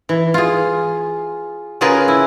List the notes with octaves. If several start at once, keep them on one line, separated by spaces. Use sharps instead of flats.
E3
F4 G#4
C#3 F4 G#4 A#4 B4 G#5
E4